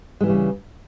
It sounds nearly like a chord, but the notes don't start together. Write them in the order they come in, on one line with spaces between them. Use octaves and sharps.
G#3 E3 G3 C#3